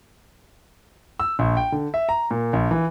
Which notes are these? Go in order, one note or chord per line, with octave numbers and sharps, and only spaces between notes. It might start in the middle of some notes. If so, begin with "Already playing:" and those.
E6
A#1
G5
D3
E5
A#5
A#2
A#1
E3